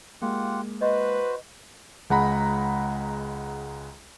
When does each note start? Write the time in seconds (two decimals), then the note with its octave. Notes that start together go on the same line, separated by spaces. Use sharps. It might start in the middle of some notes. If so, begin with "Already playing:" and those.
0.22 G#3 A#3 F4 G4 F#5
0.81 F#4 B4 C5 D#5
2.10 C#2 G#3 F#5 A#5 B5